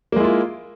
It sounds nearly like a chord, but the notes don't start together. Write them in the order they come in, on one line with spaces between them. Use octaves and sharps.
A#3 G#3 E4 F4